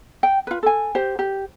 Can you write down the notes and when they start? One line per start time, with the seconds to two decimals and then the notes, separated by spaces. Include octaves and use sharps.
0.23 G5
0.47 F4 B4
0.63 A4 G#5
0.95 G4 C5
1.19 G4